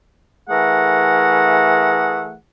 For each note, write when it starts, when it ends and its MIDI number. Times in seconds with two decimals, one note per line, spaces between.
0.49 2.34 52
0.49 2.34 57
0.49 2.34 68
0.49 2.34 70
0.49 2.34 78